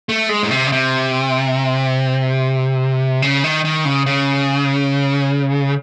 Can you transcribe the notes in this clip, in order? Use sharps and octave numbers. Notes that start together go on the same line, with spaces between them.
A3
G#3
A2
C3
C#3
C3
C#3
D#3
D#3
C#3
C#3